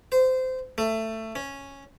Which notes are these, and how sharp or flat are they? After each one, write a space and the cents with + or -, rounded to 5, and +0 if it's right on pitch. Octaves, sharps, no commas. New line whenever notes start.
C5 -20
A3 +15
C#4 -5